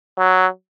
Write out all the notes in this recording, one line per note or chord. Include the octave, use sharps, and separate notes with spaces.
F#3